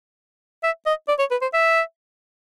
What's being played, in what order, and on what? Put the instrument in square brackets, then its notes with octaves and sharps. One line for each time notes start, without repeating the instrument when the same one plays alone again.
[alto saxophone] E5
D#5
D5
C#5
B4
C5
E5